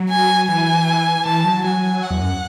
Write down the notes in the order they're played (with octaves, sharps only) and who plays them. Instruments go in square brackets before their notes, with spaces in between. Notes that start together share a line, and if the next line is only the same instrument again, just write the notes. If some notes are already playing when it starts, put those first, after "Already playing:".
Already playing: [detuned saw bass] F#3
[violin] G#5
[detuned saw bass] E3 [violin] G#5
[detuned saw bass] E3 [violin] A5
[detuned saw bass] F#3
[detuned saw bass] F#3 [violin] G#5
[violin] F#5
[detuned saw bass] E2
F#2